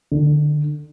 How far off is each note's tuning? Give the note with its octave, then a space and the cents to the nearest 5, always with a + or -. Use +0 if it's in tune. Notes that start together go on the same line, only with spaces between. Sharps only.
D3 +25